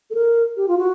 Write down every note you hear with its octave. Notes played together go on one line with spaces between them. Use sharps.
A4
A#4
G4
F4
F#4